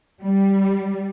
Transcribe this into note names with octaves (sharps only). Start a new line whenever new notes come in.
G3